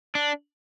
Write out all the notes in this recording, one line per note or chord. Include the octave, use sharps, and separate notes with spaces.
D4